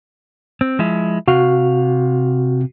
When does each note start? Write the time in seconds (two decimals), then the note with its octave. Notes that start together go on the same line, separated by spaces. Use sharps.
0.61 C4
0.79 F3 G#3 E4
1.28 C3 F#4 F5